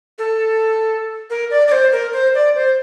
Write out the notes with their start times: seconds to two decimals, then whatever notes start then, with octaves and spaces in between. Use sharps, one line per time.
0.19 A4
1.30 A#4
1.51 D5
1.68 D5
1.72 C5
1.92 A#4
2.13 C5
2.35 D5
2.55 C5